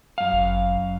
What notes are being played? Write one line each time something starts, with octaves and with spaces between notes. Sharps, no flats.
F#2 F5
G1